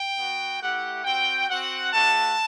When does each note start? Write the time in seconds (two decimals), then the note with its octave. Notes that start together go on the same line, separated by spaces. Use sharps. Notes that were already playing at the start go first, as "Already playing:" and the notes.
Already playing: G5
0.17 B3 F#4
0.61 A3 E4 G4 F#5
1.05 C4 F#4 G5
1.49 C4 F#4 F#5
1.92 A3 D4 F#4 A5